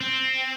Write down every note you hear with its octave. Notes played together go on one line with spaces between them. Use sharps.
C4